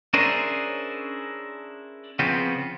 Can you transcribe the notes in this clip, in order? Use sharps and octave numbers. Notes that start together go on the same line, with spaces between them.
C#4 D4 E4 G#4 A#4 C5
C#3 F3 B3 C4